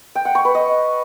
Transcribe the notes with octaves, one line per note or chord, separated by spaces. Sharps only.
G5
F#5
C#6
B4
D#5